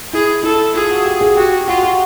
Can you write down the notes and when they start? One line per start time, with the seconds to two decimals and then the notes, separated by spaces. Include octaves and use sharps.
0.13 E4 G#4
0.43 E4 A4
0.75 F4 G#4
0.90 F#4
1.05 G4
1.21 G#4
1.37 F#4 G4
1.67 F4 F#4
1.83 F#4